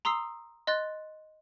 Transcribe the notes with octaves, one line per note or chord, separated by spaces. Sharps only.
A#5 C6 D#6 E6 C7
D#5 C6 F#6 A6